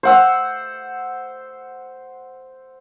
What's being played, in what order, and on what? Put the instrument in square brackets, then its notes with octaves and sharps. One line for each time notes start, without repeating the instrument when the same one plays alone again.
[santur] C5 F#5 E6